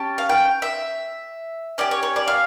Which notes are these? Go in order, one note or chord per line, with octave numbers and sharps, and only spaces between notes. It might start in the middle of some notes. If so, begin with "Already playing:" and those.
Already playing: C#4 G4 A5
F5
G5
E5
C#4 G4 D5
C#5
C#5
D5
F5